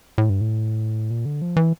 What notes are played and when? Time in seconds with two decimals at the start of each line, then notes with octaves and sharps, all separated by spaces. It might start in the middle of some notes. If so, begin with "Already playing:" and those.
0.18 A2
0.30 G2
0.41 A2
1.11 A#2
1.25 D3
1.42 F3
1.56 E3